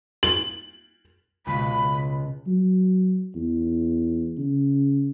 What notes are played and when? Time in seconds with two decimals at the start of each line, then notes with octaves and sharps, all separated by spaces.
0.23 F#7
1.47 C#2 B2 G#3 B5
2.47 F#3
3.36 E2
4.38 C#3